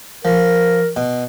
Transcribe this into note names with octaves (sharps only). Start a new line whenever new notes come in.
F3 A#4
B2